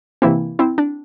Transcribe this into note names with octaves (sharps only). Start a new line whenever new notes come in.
C3 E3 A#3 C4 E4
C4 E4
D4